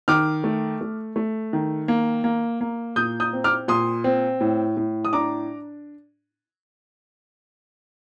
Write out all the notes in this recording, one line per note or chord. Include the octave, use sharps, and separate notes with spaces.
D#3 D6 F6
A3
A3
A3
D#3
A#3
A#3
A#3
A#2 D#6 G6
D#6 G6
C4
D6 F6
A#2 C6 D#6
C4
A2
A2
D#6
D4 A#5 D6